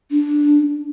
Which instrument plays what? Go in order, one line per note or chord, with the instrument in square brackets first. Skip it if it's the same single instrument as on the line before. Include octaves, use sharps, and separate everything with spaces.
[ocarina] D4